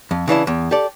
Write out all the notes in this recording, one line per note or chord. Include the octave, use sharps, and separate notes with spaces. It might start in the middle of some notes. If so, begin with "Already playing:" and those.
F2
C#3 E3 D4 E4
E2
G4 A4 D5